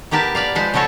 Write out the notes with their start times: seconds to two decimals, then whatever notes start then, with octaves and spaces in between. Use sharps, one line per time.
0.11 B3 G4 A#4 B4 A5
0.35 B4 D5 F5
0.55 F3 G#3 B4 C5
0.74 C#3 F3 F#4 A4 C#5